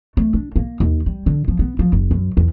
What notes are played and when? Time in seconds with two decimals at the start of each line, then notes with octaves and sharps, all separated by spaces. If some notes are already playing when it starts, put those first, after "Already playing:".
0.17 A3
0.34 D4
0.56 A#3
0.80 D#2
1.06 G3
1.26 D3
1.48 F3
1.59 B3
1.79 F3
1.92 F#1
2.11 F#2
2.37 E2